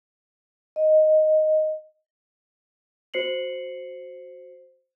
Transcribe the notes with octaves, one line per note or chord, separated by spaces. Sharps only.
D#5
F#4 C5 C7 C#7 F#7